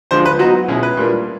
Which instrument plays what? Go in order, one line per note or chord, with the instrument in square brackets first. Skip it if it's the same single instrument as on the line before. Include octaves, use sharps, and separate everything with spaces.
[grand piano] D3 F3 G#3 C5
B4
F#3 B3 D#4 F#4
B2 G#3 C#4 E4
B4
A#2 G3 A#3 D4